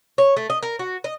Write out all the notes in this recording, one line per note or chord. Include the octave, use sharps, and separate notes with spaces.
C#5
A3
D#5
A#4
F#4
D#5